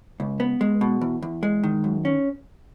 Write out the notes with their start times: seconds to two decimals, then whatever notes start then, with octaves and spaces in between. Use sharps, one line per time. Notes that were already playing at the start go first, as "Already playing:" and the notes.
0.20 C#2
0.40 B3
0.61 G#3
0.81 B2
1.01 E2
1.23 E2
1.43 G#3
1.63 D#3
1.84 F#2
2.05 C#4